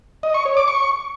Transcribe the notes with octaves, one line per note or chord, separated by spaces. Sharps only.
D#5
C#6
C#5
D6
C#6